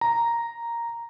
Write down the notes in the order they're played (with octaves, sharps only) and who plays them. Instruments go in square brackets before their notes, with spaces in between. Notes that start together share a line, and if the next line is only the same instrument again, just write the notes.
[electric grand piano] A#5